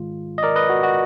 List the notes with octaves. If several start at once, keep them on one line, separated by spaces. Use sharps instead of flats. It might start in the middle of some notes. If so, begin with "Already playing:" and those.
Already playing: G#2 D#3 G#3 F4
D#5
A#4 D5
B4 D#5
F#4
F#4